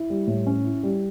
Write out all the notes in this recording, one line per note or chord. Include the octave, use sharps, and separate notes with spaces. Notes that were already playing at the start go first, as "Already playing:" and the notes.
Already playing: E4
G3
A2
C#4
E4
G3